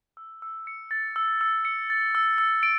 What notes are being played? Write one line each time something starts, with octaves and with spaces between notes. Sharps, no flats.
E6
E6
C#7
A6
E6
E6
C#7
A6
E6
E6
D7